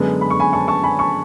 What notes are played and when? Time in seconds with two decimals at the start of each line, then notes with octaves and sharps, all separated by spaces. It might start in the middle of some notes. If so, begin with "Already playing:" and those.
Already playing: F#2 D3 G#3 B3
0.21 B5
0.30 C#6
0.40 G#5 B5
0.53 A5 C#6
0.68 A5 C#6
0.84 G#5 B5
0.99 A5 C#6